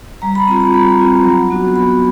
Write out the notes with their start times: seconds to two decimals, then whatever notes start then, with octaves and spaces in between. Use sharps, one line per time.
0.22 G3 A#5
0.35 B5
0.48 C4 F4 B5
0.60 A#5
0.74 G3 B5
0.99 C4 F4
1.24 F#3
1.50 B3 D4 F#4
1.76 F#3 B5